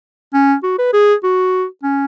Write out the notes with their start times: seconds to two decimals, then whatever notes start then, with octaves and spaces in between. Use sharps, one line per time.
0.34 C#4
0.63 F#4
0.78 B4
0.93 G#4
1.23 F#4
1.83 C#4